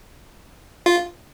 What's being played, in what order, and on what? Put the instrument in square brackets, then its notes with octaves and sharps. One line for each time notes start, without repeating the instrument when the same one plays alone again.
[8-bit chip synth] F4